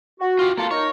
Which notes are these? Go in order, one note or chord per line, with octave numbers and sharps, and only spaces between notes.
F#4
F4 G4
A#3 F4 A4
D#4 A#4 C#5